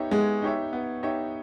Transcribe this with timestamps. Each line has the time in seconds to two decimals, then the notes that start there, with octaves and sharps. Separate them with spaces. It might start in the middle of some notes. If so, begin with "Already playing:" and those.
Already playing: B3 D#4 G4 C#5 E5
0.11 G#3 B3
0.42 D#4 G4 C#5 E5
0.73 B3
1.03 D#4 G4 C#5 E5